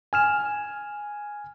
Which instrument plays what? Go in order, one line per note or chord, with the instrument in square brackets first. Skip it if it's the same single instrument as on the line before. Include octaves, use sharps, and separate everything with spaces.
[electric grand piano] G#5 F6 E7